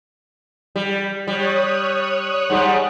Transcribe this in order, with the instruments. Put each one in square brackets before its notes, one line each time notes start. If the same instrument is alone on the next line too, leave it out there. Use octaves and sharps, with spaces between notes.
[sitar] G3
[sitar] G3 [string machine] C#5 D#6 F#6
[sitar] G#2 G3